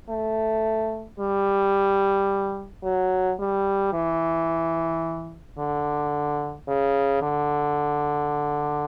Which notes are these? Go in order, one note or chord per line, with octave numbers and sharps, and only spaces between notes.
A3
G3
F#3
G3
E3
D3
C#3
D3